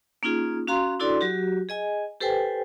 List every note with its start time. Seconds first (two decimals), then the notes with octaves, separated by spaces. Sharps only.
0.23 A#3 C#4 D#4 F4 G#4
0.68 C#4 F#4 F5 A#5 C6
0.99 D4 E4 F#4 A4 D5 C6
1.21 F#3 F#4 G4
1.69 G#4 D#5 G#5
2.21 G4 A4 B4 C5 G5 G#5